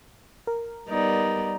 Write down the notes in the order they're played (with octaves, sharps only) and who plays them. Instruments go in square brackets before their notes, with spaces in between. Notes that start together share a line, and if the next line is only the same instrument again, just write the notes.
[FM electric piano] A#4
[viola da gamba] G3 B3 D5 [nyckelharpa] D#4